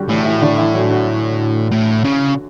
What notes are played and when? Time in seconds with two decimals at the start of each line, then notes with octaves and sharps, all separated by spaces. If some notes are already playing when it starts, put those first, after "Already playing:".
Already playing: D3 F#3 G3 F#4 G4
0.09 A2 E3 E4
0.25 E3 E4
0.41 D3 D4
0.58 E3 E4
0.74 F#3 F#4
0.90 F#3 F#4
1.72 A2
2.05 C#3